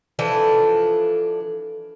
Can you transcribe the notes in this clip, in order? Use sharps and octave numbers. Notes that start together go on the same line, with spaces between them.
E3 F3 D4 A4